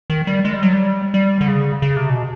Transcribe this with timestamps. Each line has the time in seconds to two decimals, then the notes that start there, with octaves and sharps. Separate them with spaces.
0.10 D#3
0.27 G3
0.45 G#3
0.53 G3
0.63 F#3
0.73 G3
1.14 G3
1.41 D3
1.48 C#3
1.82 C#3
1.96 C3
2.10 B2